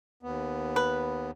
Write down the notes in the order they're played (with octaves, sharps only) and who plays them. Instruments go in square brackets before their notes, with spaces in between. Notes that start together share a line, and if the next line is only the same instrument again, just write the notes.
[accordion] D#2 B3
[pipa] B4